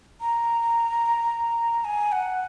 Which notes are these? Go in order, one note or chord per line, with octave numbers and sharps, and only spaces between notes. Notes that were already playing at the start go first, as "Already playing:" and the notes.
A#5
G#5
F#5